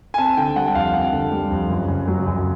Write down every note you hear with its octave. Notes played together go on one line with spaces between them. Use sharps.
G#5
C4 A5
D3 G5
G3 F#5
F2 F5
C4 F#5
D3
G3
F2
F#2
C#3
F#3
F#2